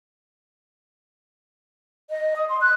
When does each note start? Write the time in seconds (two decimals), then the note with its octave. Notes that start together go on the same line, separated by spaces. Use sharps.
2.10 D#5
2.35 D#6
2.48 C6
2.62 F#6